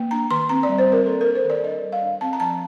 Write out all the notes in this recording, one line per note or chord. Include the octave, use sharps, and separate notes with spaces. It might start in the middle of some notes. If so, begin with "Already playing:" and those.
Already playing: A#3
D4 A#5
D#3 C6
C4 A#5
G3 D5
C5
C4 A#4
A#3 A4
A#4
D4
C5
D#3
D5
D4 D#5
G3
F5
D4
C4 A5
A#5
F3 A5